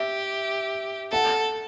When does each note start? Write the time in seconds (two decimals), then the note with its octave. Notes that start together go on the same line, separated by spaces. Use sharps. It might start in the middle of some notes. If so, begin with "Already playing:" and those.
Already playing: G4 E5
1.12 A4 F#5